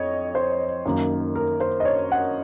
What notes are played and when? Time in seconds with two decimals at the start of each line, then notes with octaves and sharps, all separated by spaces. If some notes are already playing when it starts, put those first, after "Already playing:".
Already playing: F2 C#5 D#5
0.35 C5
0.85 F#2 D#3 A#3 D#4
1.36 A#4
1.60 C5
1.80 D#5
1.85 C#5
2.12 F#5